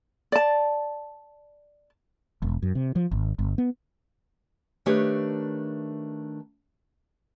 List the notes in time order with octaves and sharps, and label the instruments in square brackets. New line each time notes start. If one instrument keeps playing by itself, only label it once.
[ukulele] D5 A5
[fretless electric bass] E1
F#2
C3
F3
G#1
G1
B3
[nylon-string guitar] D#3 A3 D4 G4 B4 C#5